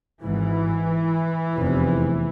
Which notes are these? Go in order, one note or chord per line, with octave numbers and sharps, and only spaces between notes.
G#1 G#2 E3
F1 E2 C3